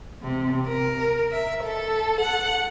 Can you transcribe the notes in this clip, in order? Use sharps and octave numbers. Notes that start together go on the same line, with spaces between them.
C3
A#4
E5
A4
F#5